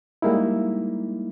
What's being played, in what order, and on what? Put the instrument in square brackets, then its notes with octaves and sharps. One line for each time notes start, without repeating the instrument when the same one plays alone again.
[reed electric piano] G3 G#3 A#3 D#4 E4